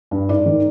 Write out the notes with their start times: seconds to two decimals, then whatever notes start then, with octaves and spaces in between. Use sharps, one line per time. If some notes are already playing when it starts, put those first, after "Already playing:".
0.11 G2
0.29 G#2 D5
0.46 D#3